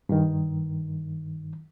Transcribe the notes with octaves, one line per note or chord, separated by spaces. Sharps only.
G2 D#3